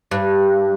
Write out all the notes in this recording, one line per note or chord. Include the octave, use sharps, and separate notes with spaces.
G2